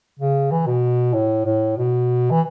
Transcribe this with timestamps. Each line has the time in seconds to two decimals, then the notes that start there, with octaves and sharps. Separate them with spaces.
0.19 C#3
0.51 E3
0.66 B2
1.14 A2
1.45 A2
1.78 B2
2.31 E3